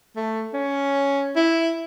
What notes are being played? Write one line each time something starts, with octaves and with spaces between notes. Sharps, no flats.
A3
C#4
E4